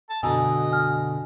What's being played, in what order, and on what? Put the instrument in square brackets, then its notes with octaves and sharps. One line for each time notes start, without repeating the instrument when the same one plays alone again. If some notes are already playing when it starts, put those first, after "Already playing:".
[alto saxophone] A5
[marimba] F#2 E6 [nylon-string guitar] B2 D3 [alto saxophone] D#5 [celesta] G#5
[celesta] G#5 F6